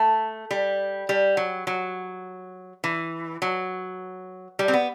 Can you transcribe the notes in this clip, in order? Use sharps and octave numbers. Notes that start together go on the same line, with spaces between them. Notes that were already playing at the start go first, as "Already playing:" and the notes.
Already playing: A3
G3
G3
F#3
F#3
E3
F#3
G3
C4
B3